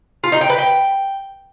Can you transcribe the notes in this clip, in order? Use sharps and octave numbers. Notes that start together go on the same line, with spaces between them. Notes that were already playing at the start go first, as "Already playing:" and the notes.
F4
D#4
G5
B4
G5